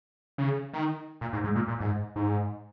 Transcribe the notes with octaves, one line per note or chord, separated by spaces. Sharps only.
C#3
D#3
A#2
G#2
G#2
A#2
A#2
G#2
G#2